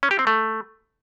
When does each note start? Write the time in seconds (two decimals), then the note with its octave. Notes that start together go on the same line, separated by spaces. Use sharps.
0.03 C#4
0.11 G4
0.19 C4
0.27 A3